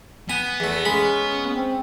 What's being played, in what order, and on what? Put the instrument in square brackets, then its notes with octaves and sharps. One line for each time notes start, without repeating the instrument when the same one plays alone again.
[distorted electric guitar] B3 [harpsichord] G#5
[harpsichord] E2 A3
[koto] G#3 [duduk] C#4 [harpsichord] B5
[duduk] C4